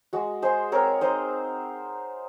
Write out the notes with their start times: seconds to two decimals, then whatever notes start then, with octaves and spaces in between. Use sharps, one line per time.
0.13 G#3 F#4
0.42 G#3 G#4 C5
0.72 C4 A#4 C#5
1.01 D#4 C5 D#5